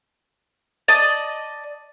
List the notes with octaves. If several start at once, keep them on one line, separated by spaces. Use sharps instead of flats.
D5 D#5 A5 D#6